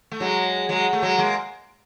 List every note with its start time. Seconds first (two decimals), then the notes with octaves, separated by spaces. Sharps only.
0.11 A3
0.20 F#3 G#3
0.69 F#3 G#3
0.93 A3
1.03 F#3 G#3
1.18 G#3 A#3